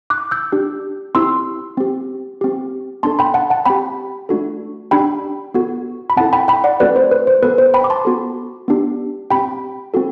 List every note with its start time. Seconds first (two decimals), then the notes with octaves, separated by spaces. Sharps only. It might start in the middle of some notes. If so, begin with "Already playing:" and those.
0.10 D6 F#6
0.31 E6 G6
0.52 D4 G4
1.15 C4 E4 G4 C6 E6
1.77 C4 G4
2.41 C4 G4
3.03 B3 D4 A4 A5 C6
3.19 G5 B5
3.34 F#5 A5
3.50 F#5 A5
3.66 C4 G4 G5 B5
4.29 A3 D4 F#4 A4
4.91 D4 G4 G5 B5
5.54 B3 F#4 A4
6.10 B5
6.17 C4 E4 A4 F#5 A5
6.33 G5 B5
6.48 G5 B5
6.64 D5 F#5
6.80 A3 C4 F#4 A4 B4 D5
6.96 C5
7.11 B4
7.27 C5
7.43 B3 F#4 A4 B4
7.58 C5
7.74 G5 B5
7.84 D6
7.90 A5 C6
8.05 B3 F#4 A4
8.68 B3 D4 G4
9.31 C4 G4 G5 B5
9.94 C4 F#4 A4